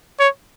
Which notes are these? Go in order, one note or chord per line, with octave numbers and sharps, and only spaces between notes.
C#5